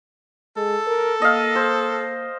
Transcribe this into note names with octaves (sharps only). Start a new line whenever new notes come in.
G#3 A4
A#4
A#3 D#5 F5
C5